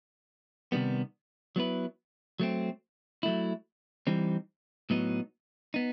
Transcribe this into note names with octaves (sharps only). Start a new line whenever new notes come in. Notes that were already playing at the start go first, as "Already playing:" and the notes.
C3 D#3 G3 B3
F#3 B3 E4 B4
F#3 A3 C4
F#3 A3 E4
E3 G3 C4 D#4
A2 F#3 B3 D#4
B3 D#4